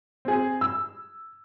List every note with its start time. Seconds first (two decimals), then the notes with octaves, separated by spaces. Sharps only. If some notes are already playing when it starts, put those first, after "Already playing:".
0.25 C4 G#4
0.61 E6